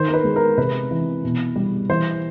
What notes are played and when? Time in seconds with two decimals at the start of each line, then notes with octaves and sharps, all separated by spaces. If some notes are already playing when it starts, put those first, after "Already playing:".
Already playing: D#3 C5
0.08 A#4
0.14 B4
0.24 G#3
0.36 A#4
0.58 C3 B4
0.91 E3
1.24 B2
1.56 G3
1.89 E3 C5